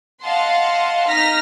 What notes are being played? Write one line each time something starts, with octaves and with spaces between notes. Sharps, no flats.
D#5 F5 F#5 A5 C6
D#4 F6 A#6 B6